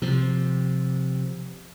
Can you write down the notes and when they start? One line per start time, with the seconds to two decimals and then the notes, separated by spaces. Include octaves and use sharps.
0.02 C3 F3